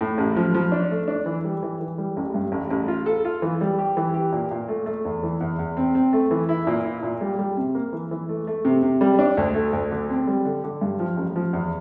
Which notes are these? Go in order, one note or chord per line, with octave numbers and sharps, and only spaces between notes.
A2
A1
F3
F3
D4
A3
D4
E3
G3
E3
E3
G3
A1
G2
A1
A1
F4
A4
F4
E3
G3
G4
E3
G4
A#2
A#2
A3
A3
E2
E3
E2
E2
C4
C4
A3
E3
E4
A#2
E4
A#2
G3
G3
C3
A#3
E3
E3
A3
A3
C3
C3
G3
D4
D2
A3
D2
D3
C4
G3
D3
D3
G2
F3
A1
F3
E2